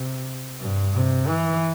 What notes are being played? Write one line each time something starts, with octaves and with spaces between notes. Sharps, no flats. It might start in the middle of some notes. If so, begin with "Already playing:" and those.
Already playing: C3
G2
C3
E3